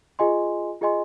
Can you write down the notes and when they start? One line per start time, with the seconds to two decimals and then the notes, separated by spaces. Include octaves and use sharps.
0.19 F4 G#4 D#5 G#5 C6
0.81 F4 G#4 D#5 G#5 C6